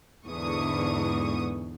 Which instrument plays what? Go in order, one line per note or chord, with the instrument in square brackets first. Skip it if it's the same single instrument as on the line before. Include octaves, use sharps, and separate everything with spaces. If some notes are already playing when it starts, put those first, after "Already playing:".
[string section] E2 G#2 D3 E3 C#6 D#6